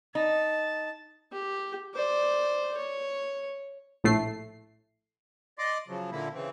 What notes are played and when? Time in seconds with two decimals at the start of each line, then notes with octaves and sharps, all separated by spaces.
0.15 D#4 A5
1.32 G4
1.95 C5 D5
2.77 C#5
4.04 A#1 A2 A3 C7
5.59 D5 D#5 C6 D6
5.88 C#3 F3 F#3
6.11 A#2 D3 A#3 E4
6.33 C#3 E3 C4